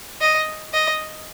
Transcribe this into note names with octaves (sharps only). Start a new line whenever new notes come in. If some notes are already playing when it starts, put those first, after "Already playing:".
D#5
D#5